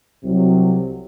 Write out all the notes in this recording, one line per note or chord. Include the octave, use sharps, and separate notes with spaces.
C2 C3 F#3